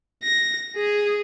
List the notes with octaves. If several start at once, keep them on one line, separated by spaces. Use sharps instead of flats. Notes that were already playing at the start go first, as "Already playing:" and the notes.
A#6
G#4